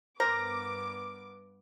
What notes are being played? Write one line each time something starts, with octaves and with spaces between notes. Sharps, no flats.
G2 B3 A#4 C5 D6 A#6